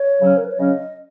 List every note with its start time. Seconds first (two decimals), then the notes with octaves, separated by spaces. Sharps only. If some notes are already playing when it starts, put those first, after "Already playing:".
Already playing: C#5
0.19 C#3 F#3 C#4
0.37 A#4
0.44 B4
0.52 C#5
0.58 C#3 F#3 C#4 D#5